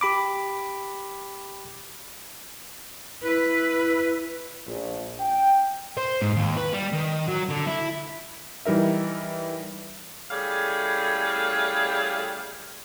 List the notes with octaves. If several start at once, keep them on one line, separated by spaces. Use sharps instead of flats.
G4 B5 D6
E4 B4
A#1
G5
C5
G#2
D#2
B4
G3
D#3
F#3
D3
E4
E3 G3 D#4 A#4 E5
G3 A3 C#4 E4 G#4 F5